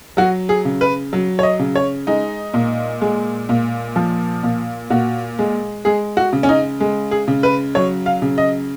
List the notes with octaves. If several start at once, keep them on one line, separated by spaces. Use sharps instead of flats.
F#3 F#4
G#4
C#3
B4
F#3
C#5
D#5
C#3
C#5
G#3 D#4
A#2
G#3
A#2
F3
A#2
A#2 F#4
G#3
G#3 G#4
F#4
C#3
C#4
D#4
G#3
G#4
C#3
B4
F#3 C#5
F5
C#3
D#5